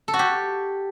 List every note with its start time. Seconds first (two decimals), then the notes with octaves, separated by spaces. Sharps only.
0.08 A4
0.14 F#4
0.19 G4